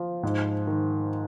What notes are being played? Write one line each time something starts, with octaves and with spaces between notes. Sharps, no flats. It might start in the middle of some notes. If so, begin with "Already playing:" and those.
Already playing: F3
G#2
D#3